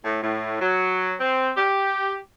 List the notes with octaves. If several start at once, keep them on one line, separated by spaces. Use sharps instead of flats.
A2
A2
F#3
C4
G4